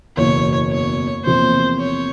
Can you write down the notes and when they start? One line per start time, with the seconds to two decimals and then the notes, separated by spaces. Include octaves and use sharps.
0.17 F#1 E2 B2 C#5
0.72 C#5
1.25 E2 C3 F3 A#3 C5
1.80 C#5